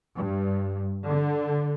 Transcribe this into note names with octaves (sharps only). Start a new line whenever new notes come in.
G2
D3